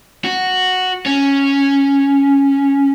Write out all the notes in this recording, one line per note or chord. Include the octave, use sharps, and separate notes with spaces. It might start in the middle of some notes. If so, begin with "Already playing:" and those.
F#4
C#4